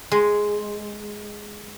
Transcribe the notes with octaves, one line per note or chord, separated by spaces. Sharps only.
G#3